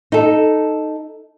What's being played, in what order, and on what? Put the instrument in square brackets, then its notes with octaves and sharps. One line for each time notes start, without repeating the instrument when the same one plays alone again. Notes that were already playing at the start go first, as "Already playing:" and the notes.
[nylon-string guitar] D#4 A4